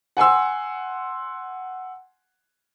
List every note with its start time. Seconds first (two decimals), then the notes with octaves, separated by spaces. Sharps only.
0.17 F#5 G#5 C6 E6